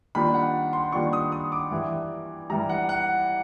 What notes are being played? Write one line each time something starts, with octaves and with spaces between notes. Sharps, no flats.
D#3 G3 A#3 D4 F4 B5
F#5
C6
D#3 G3 A#3 D4 F4 C#6
D#6
D#6
D6
G2 E3 G3
G2 E3 G3 A#5
F#5
F#5